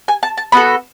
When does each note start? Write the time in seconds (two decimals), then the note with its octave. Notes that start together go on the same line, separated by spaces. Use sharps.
0.08 G#5
0.23 A5
0.38 A5
0.52 B3 F#4 A4 B5